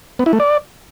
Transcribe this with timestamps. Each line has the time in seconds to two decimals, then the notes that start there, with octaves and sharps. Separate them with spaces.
0.19 B3
0.26 E4
0.33 A3
0.40 D5